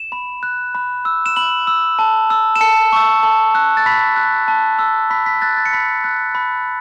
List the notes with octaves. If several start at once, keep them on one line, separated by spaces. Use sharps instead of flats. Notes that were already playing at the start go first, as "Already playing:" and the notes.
Already playing: E7
B5
F#6
B5
E6
E7
B5 F#7
E6
A5
E6
E7
A5 C#7
C#6 E6
A5
F#6
A6
B5 B6
F#6
A5
E6
B5 B6
B6
F#6 A6
A6
C#7
B5 B6
F#6
B5